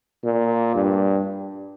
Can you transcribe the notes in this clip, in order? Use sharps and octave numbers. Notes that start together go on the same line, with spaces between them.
A#2
G2